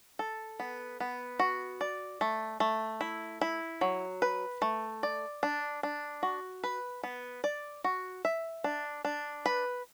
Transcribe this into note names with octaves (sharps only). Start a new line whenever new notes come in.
A4
B3
B3
F#4
D5
A3
A3
E4
E4
F#3
B4
A3
D5
D4
D4
F#4
B4
B3
D5
F#4
E5
D4
D4
B4